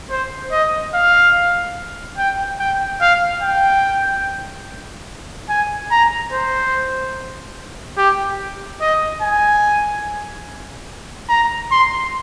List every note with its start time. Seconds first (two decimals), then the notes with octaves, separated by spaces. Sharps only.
0.10 C5
0.52 D#5
0.94 F5
2.18 G5
2.59 G5
3.01 F5
3.42 G5
5.49 G#5
5.91 A#5
6.32 C5
7.97 G4
8.81 D#5
9.22 G#5
11.29 A#5
11.71 C6